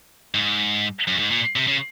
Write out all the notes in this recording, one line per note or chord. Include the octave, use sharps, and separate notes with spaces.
G#2
F#2
G#2
A#2
C3
C#3